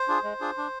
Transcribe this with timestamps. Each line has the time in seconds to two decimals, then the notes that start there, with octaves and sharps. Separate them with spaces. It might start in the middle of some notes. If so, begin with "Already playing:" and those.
Already playing: C5
0.08 D4 F4 G#4
0.24 G#3
0.41 D4 F4 G#4
0.58 D4